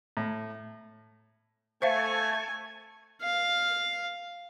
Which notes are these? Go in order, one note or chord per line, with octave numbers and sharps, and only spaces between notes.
A2
A3 C5 E5 F5 G#5 A5 C#6 G#6
F5